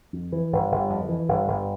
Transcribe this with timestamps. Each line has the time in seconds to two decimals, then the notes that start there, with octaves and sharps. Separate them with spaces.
0.13 F2
0.32 E3
0.52 G1
0.71 G1
0.90 F2
1.09 E3
1.29 G1
1.47 G1